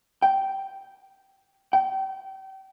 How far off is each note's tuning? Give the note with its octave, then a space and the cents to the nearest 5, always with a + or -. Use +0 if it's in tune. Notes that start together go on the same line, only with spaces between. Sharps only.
G5 -15
G5 -30